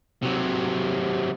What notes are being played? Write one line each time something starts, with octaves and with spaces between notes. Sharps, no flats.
C3 F#3